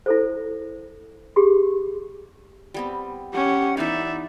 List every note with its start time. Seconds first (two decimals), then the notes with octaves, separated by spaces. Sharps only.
0.06 E4 A4 C5
1.36 G4 G#4 C6
2.74 G3 B3 C4
3.34 C#4 G4 F#5
3.77 E3 B3 D#4 D5 E5